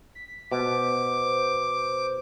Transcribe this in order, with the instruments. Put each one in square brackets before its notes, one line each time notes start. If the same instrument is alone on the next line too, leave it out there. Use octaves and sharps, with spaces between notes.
[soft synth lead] B6
[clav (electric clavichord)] B2 [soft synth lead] C5 [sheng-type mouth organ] D6